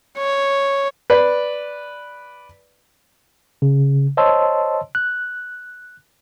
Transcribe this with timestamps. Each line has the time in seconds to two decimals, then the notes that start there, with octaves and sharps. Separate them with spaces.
0.18 C#5
1.10 B4 D5
3.62 C#3
4.17 C5 C#5 D#5 A5 C6 E6
4.95 F#6